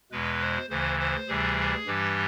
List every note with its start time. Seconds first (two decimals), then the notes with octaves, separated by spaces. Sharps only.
0.12 E2 B2 G#3 B4
0.41 C5
0.70 D2 C#3 E3 C5
0.99 C5
1.28 D2 C3 E3 G3 G#4
1.86 G2 E3 G3 G4